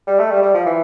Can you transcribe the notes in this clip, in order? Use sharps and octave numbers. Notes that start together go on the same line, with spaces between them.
G3
A3
G3
G3
F3
E3